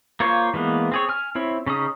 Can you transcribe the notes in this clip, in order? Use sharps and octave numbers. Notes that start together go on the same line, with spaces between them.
A#3 F4 C5 C#5
E3 G#3 A#3 B3
C4 G#4 C#5
G#5 F6
C4 E4 C#5
C#3 C#4 D#4 D#6